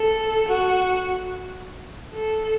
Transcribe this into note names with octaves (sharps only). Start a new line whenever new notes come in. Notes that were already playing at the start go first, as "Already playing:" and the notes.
Already playing: A4
F#4
A4